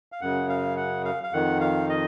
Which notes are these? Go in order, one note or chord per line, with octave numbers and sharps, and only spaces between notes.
F5
F#2 C#3 F#5
F5
F#5
F5
F5
F2 D#3 F#5
F5
D#5